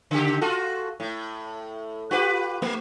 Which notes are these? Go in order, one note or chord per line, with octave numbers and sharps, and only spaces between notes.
C#3 G4
F4 F#4 A4
A2
F4 G4 B4
A3